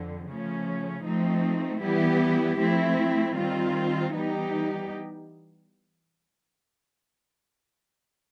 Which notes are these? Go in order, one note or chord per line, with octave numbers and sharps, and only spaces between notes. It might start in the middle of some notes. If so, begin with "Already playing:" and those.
Already playing: F2 D3
C#3 F3 A3 C#4
F3 A3 C4 D#4
E3 G3 B3 E4 G4
F3 A3 C4 E4
D#3 G3 C4 F4
E3 G3 B3 D#4 G4